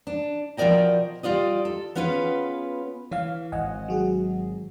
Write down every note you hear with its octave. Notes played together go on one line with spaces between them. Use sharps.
D4
B2 F3 A#4 D5 D#5 G5
G3 F4 D5 D#5
A4
B3 C#4 F4 G#4 B4
E3 C#5 F5
G#1 D#5 F#5 G#5
F#3 F#4 G#4